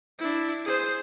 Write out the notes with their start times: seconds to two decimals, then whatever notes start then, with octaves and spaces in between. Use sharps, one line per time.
0.19 D4 E4
0.65 G#4 C5